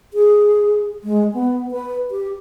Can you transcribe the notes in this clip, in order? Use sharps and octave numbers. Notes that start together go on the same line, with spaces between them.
G#4
G#3
B3
B4
G4